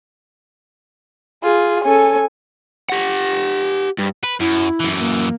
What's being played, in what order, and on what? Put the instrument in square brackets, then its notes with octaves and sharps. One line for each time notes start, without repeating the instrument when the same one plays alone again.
[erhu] F4 [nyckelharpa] G#4
[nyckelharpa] C#4 A4 [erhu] G#5
[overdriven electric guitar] G4 F#5
G2
[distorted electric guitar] B4
[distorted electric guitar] F#2 [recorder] E4
[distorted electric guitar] F#2 E3
[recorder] A#3